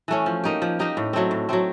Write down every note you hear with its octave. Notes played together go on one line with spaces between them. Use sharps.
E3 A3 C#4
F3
A#3 D#4 G4
F3
A#3 D#4 G4
A2
F#3 A3 C4
A2
F#3 A3 C4